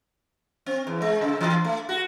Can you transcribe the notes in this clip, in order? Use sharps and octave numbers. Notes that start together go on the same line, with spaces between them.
C4
E2
G#3
C#3
E3
A3
F#4